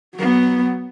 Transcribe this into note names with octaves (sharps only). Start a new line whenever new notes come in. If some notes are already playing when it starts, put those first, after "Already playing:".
F#3 B3